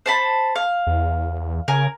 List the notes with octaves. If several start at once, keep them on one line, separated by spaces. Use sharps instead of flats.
C5 A5 B5
F5
E2
C#3 A#4 G#5